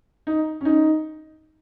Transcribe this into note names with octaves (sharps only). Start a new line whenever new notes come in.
D#4
C#4
D#4